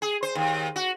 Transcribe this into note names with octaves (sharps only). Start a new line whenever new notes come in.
G#4
C5
D#2
F#4